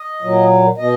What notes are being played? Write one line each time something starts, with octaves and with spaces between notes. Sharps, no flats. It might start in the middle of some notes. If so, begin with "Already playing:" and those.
Already playing: D#5
A#2 F#3
B2 D#5